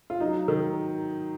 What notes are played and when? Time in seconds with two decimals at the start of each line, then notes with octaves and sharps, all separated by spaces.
0.10 F4
0.20 F#3 D#4
0.48 D#3